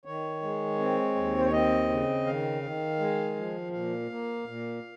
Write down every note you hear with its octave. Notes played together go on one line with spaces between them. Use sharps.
D#3 C#5
G#3
C4
D#2
C5
C#5
C4 D#5
C#3
D#3 F5
D#3
G#3
F3
A#2 F5
A#3
A#2